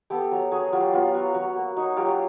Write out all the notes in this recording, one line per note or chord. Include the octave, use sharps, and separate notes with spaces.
B3 G4 A4
F#3
F#3 F#4 G#4
F#3 F4 G4
B3 F4
F#3 F#4
F#3 F#4
A#3
D#4 F#4
F#3 F4 G4